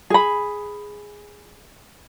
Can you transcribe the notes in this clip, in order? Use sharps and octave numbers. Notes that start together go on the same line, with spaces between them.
G#4 B5